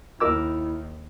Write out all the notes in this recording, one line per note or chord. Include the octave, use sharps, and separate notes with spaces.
D#2 E4 A#4 D6 E6